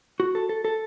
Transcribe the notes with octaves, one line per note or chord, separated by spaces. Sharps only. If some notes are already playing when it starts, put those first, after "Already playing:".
F#4
A4
A4
A4